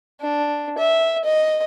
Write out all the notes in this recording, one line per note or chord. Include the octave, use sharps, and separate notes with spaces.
D4
E5
D#5